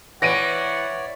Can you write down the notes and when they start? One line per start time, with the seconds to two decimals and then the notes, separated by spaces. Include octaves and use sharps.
0.22 E3 C#5 D5 F#5 A#6 D7 D#7